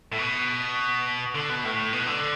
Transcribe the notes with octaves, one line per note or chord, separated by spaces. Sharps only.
A2
B2
D3
B2
A2
B2
D3